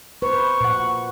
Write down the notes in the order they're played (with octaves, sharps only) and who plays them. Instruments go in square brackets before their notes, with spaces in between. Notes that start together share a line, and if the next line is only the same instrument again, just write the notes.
[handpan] B4 C5 [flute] C#6
[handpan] A#2 F#5